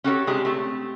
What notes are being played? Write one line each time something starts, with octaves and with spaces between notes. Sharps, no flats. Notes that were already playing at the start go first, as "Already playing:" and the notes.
C#4 F#4 G4 A4 B4 C#5
C3 G#3 D4 G4 G#4
A3 C4 G4